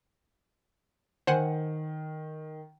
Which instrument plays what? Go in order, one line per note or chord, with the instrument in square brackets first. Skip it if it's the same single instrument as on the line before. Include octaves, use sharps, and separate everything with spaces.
[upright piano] D#3 [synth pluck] C5 F#5 G#5